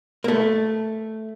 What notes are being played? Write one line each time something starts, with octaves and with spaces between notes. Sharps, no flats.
A#3
A3